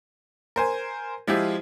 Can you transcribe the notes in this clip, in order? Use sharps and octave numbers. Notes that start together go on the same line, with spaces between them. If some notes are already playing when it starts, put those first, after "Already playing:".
A#4 C5 G#5
F3 G#3 E4 F4 G4